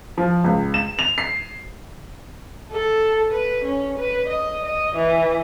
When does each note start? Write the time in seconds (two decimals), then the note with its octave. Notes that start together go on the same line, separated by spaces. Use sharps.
0.18 F3
0.44 C#2
0.74 E7
0.99 F7
1.18 C7
2.72 A4
3.32 B4
3.64 C#4
3.98 B4
4.28 D#5
4.65 D#5
4.96 E3